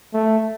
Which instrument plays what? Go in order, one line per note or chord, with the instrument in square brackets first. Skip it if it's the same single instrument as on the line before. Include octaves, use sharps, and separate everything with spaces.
[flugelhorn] A3